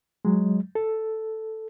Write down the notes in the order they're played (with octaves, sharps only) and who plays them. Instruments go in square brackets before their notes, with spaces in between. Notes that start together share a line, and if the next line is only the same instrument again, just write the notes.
[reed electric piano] F#3 G#3
A4